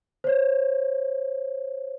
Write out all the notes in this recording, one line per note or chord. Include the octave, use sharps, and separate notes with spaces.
C5 C#5